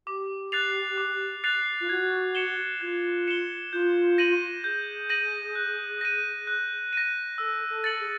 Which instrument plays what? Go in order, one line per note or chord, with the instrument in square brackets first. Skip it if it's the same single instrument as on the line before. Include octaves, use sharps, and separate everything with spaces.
[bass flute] G4 [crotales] D6
[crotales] F#6 A6 C7 F7
D6
F#6 A6 C7 F7
[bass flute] F4
[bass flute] F#4 [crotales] G#6
[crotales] C#7 E7 G7
[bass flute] F4 [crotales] G#6
[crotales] C#7 E7 G7
[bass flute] F4 [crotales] G6
[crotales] A#6 D#7 F#7
[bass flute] G#4 [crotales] G6
[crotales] A#6 D#7 F#7
F#6
A#6 D#7
F#6
A#6 D#7
[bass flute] A4 [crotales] E6
[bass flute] A4
[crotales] A6 C#7 F#7
[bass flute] G#4